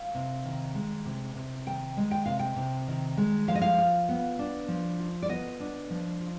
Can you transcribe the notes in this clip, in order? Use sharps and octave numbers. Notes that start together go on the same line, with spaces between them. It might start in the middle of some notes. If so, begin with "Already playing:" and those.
Already playing: F5
C3
D#3
G#3
C3
C3
D#3 G5
G#3
G5
C3 F5
G5
C3
D#3
G#3
F3 F5
D#5
F5
F4
B3
D4
F3
F4
D5
B3 D#5
D4
F3
F4